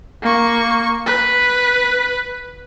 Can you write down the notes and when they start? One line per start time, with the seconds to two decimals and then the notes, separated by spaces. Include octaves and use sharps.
0.23 A#3 C#6
1.06 B4